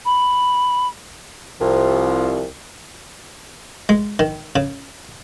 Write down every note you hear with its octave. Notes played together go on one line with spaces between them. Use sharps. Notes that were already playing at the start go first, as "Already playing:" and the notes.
B5
C2 F3
G#3
D#3
C#3